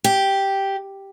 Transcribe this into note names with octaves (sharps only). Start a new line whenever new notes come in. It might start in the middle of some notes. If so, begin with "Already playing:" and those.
G4